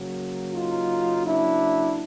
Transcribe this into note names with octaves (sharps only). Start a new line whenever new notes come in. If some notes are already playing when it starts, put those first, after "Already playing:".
Already playing: C#3 F#3 A#3
D#4 F4
D4 E4